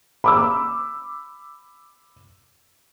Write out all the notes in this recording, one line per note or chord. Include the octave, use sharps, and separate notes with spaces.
B5 D6 E6